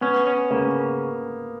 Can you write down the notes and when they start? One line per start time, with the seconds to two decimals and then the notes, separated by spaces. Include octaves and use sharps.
0.01 B3 C#4
0.27 C#4
0.51 C#3 A#3